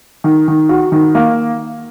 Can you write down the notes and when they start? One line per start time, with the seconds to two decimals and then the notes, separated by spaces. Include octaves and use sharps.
0.24 D#3
0.48 D#3
0.69 F#4
0.92 D#3
1.15 A#3